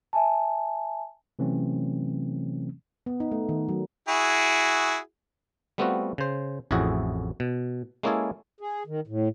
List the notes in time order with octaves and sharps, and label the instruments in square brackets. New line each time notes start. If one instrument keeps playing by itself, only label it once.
[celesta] E5 G#5 A5
[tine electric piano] C3 E3 F#3 A3 C4 C#4
[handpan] B3
D#4
A3
D#3
F#3
[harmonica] E4 F#4 G#4
[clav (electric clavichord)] G3 A3 B3 C4 F4 F#4
C#3 C5
A1 F2 A2 E4 F#4 G#4
B2
G#3 A#3 C#4 E4 G#4 A4
[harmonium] G#4
D#3
A2